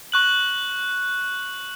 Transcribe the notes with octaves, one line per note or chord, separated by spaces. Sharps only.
C#6 F#6 F#7